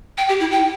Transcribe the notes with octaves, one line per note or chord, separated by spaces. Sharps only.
G5
G4
E4
G5